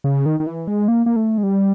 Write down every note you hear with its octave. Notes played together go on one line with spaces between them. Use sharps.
C#3
D#3
D#3
E3
G#3
A#3
A#3
A3
G#3
G3